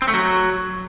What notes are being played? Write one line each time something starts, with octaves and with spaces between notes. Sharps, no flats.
C4
A3
F#3